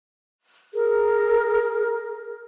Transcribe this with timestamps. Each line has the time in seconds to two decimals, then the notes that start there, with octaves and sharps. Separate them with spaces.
0.73 G#4 A#4